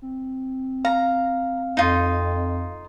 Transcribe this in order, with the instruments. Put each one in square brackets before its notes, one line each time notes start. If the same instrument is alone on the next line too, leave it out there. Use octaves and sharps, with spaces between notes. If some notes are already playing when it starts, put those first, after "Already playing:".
[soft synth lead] C4
[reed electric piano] F5 [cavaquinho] A#5
[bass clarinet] F2 [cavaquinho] D#4 F4